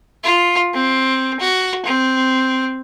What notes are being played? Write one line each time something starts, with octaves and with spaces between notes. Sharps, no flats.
F4
C4
F#4
C4